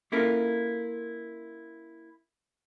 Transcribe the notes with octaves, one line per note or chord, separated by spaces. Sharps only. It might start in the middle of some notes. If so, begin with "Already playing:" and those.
A#3 C#4 E4 F4 A4 A#4